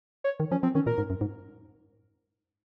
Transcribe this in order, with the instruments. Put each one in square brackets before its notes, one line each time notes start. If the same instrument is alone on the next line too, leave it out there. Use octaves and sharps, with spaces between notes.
[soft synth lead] C#5
[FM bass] D#3
[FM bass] F3 [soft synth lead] C#4
[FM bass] F3 [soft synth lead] C4
[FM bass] D#3 [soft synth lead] C#4
[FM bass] A#2 [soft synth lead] A#4
[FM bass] G#2
F#2
G#2